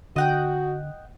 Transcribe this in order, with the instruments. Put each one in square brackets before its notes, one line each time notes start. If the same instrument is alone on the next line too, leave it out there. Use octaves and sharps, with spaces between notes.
[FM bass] D3 [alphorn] F#4 [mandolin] D#5 F#5 G5